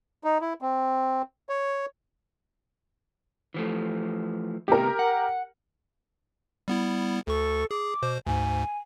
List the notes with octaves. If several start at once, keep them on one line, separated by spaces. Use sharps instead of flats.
D#4
E4
C4
C#5
E3 F3 A3
A2 C3 B3 G4 A#4
F#5
G3 B3 E4
D2 A4 C#6
G#4 D6
B2 C5
D2 G#2 G#5